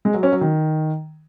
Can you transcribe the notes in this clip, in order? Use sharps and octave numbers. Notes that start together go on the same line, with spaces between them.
G#3
F#3
C#4
F#3
D#3